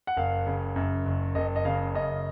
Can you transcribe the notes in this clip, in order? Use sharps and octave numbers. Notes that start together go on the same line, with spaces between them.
F#5
F#1 F5
C#3
F#2
F#1
F#1 D#5
D#5
C#3 F5
F#2 D#5